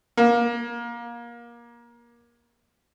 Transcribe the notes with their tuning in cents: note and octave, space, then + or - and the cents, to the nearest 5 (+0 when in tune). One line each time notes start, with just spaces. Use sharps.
A#3 +25